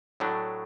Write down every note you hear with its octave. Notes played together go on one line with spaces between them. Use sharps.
A2 F#3 A3 D4